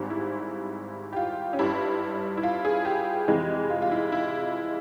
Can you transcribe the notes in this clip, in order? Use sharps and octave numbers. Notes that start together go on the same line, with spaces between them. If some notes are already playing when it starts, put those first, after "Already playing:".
Already playing: G#1 G#2 G3
E4
G4
F4
C#4
G1 G2 G3 E4
E4
F4
G#4
G4
F2 C3 E3 G#3
F4
F4
E4
E4